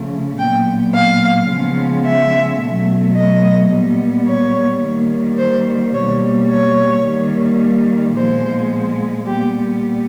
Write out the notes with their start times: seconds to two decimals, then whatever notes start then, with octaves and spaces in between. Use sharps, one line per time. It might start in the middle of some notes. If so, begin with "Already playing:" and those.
Already playing: C#3 F3 A3
0.38 A#2 F#3 B3 G5
0.94 F5
1.49 C#3 F3 G#3 B3
2.05 E5
2.60 B2 F#3 A3
3.16 D#5
3.71 A#2 G3 B3
4.27 C#5
4.82 D#3 G3 A#3
5.38 C5
5.93 B2 G3 A#3 C#5
6.49 C#5
7.04 D#3 G3 A#3
8.15 A#2 F3 G#3 B3 C5
9.26 A#2 G3 B3 G4